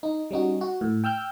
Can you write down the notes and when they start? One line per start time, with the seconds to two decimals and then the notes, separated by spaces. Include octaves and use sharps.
0.03 D#4
0.31 G3 C#4 D#4 F#4
0.61 F#4
0.81 A2
1.04 G5 E6 F6 G6